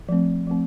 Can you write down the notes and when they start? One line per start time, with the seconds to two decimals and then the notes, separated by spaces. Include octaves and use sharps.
0.09 F3 A3 C4
0.47 F3 A3 C4